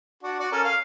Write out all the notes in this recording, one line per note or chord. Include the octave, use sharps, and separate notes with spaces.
D4 F#4
F#4 D5
C#4 A4 A#4
F5